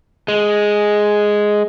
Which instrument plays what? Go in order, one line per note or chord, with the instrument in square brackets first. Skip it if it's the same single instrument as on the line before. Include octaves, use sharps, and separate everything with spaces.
[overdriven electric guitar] G#3